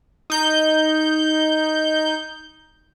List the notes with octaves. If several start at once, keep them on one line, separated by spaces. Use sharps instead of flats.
D#4 G6